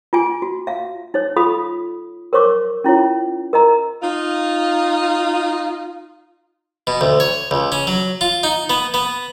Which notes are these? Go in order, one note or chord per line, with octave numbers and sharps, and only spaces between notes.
F4 G#4 G#5
F#4
E5 F5
D#4 C#5
F4 A4 F5 B5 D#6
A#4 C5 C#5 C#6 D6
C#4 E4 F4 C#5
A#4 D#5 A#5
D#4 F4
B2
D2
C#5
C#2
C#4
F#3
F4
D#4
B3
B3